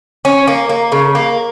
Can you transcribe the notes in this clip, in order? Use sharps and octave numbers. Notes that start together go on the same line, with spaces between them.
C#4
A#3
A#3
C#3
A#3